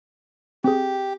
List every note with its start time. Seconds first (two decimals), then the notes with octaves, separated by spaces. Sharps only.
0.64 C4 G4 G#4